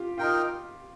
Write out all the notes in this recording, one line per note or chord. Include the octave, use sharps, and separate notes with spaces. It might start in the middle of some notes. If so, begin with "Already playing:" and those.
Already playing: F4 G4
D#4 F4 A#4 G5